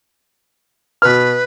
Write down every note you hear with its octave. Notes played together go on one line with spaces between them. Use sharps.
B2 B4 F6